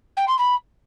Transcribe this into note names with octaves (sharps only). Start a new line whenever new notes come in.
G5
C6
B5